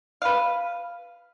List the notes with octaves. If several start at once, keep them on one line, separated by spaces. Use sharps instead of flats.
B4 F5